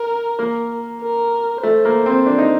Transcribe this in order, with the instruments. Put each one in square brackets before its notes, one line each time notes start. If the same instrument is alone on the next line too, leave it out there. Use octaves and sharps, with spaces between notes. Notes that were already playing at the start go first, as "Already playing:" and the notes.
Already playing: [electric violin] A#4
[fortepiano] A#3
[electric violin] A#4
[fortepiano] A3 [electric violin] C5
[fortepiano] A#3
C4
D4
D#4